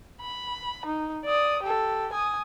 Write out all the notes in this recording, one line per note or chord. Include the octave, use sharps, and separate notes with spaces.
B5
D#4
D5 D#6
G4 A4
G#5 D#6